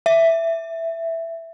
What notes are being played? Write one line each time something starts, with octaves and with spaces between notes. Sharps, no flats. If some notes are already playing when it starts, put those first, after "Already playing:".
E5